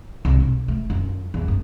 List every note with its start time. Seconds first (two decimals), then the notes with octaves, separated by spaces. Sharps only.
0.25 C2
0.40 B2
0.68 A3
0.90 F#2 F3
1.34 E2
1.48 F#2